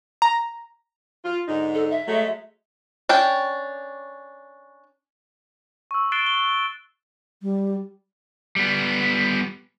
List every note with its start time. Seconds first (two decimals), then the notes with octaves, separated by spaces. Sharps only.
0.22 A#5
1.25 F4
1.48 G#2 D3 D#4
1.75 A4
1.91 E5
2.08 F#3 G#3 A3
3.09 C#4 D4 G5
5.91 C#6 E6
6.12 F#6 A6 C7 D7 E7 G7
6.27 G7
7.42 G3
8.56 G3 B3